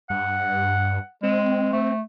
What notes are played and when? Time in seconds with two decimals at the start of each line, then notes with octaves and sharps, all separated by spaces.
0.10 G2 F#5
1.23 G#3 C4
1.73 A3